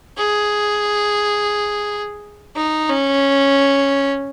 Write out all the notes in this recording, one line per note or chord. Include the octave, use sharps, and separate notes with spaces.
G#4
D#4
C#4